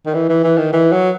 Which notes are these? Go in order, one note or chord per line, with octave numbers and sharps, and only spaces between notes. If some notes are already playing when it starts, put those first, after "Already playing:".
D#3
E3
E3
E3
D#3
E3
F#3